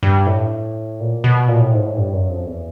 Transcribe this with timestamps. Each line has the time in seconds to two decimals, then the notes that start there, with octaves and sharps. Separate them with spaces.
0.03 G2
0.27 A2
1.00 A#2
1.24 B2
1.48 A#2
1.60 A2
1.73 G#2
1.85 A2
1.97 G2
2.13 F#2
2.30 F2
2.46 E2